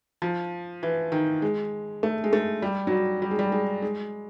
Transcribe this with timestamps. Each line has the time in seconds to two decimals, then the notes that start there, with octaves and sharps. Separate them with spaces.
0.22 F3
0.83 E3
1.12 D#3
1.42 G#3
2.03 A3
2.24 G#3
2.33 A3
2.62 G3
2.87 F#3
2.92 G3
3.22 G3
3.31 G#3
3.39 G3
3.52 G#3
3.82 G#3